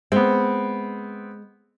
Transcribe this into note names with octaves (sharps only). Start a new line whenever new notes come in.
G#3 B3 C4